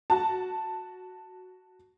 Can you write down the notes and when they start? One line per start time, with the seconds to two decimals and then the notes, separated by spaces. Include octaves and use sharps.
0.10 F#4 A5